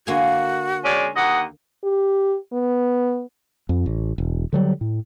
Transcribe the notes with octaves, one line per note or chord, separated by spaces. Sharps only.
D3 A#3 F#4 G#5
G#3 C#4 D5
D#2 D#5 F#5
G4
B3
F2
A1
E1
D3 F#3 G3
A2